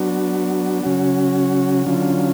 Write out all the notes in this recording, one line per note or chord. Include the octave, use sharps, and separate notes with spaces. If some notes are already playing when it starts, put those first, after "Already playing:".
Already playing: F#3 B3 D4 F#4
C#3 F#3 C#4 F#4
D3 F#3 C#4 F4